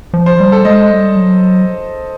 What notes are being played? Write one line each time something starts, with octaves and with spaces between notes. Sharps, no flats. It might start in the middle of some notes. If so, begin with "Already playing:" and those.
F3
C5
G3
A4
G#3 D#5
G3
F#3